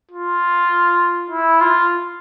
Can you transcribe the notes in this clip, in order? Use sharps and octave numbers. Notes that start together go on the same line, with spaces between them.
F4
E4
F4